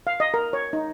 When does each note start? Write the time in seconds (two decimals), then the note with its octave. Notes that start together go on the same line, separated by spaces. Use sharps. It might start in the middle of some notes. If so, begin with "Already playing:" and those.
0.07 F5
0.20 D#5
0.34 A#4
0.53 C#5
0.73 D#4